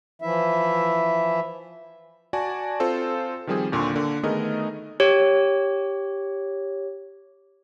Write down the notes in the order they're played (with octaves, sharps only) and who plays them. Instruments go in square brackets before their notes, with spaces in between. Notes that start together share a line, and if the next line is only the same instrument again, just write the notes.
[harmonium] E3 F3 E4 E5
[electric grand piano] F#4 D5 G#5 A5
C4 F4 A4 C5
D#3 F3 G3 C4 G#4
D#2 A#2 D3 C6 C#6
D3 A#3
D#3 A3 B3 G#4 A#4 D#5
[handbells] G4 C#5